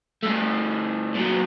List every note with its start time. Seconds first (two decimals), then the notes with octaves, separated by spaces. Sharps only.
0.23 G2 A3
1.14 A#2 F#3